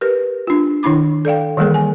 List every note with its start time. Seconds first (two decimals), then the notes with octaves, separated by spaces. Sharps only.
0.01 G4 A#4 B4
0.47 D4 F4
0.83 D#3 D4 E4 B5 D6
1.25 A4 D5 F5 G5
1.57 D#3 E3 G3 A#3 G#4 A#4
1.74 G#5